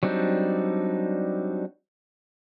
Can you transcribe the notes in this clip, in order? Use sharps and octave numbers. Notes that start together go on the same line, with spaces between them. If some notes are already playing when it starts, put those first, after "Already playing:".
F#3 G3 C4 D4 D#4